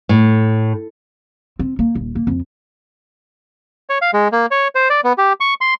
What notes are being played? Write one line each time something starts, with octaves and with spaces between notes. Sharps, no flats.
A2
C4
A#3
D#1
A#3
F2
C#5
F5
G#3
A#3
C#5
C5
D5
B3
G4
C#6
C6